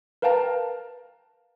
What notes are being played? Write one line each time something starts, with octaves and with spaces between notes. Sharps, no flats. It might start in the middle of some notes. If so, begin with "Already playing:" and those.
A#4 B4 F5 G5 A5 A#5